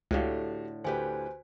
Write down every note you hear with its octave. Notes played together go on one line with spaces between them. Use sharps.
C#2 A2 D3 F#4 G4 F5
D2 G4 B4 C5 G#5